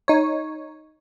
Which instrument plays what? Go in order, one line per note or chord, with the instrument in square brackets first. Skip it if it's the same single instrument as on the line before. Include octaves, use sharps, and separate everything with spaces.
[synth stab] D#4 C#5